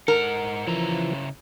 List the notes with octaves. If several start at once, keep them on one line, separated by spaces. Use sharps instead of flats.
G#2 A#4 F#5
C#3 E3 F3 E4 A#5